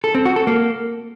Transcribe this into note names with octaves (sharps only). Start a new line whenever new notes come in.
A4
C4
F#4
A4
A#3